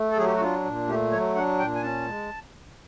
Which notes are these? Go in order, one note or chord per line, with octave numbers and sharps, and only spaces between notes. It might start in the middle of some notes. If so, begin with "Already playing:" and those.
Already playing: A3
A4
F#3 G#4
G4
F#4
D4 F4
A#2
A3 G4
F#3 C#5
D4 F#5
A#2 G5
G#5
C#4 A5
G#3